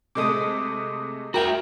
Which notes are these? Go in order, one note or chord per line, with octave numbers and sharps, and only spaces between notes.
C3 G#3 A3 D6 D#6
F#4 A#4 E5 G5 A#5